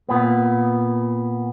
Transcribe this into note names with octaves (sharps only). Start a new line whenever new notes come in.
A#2 B3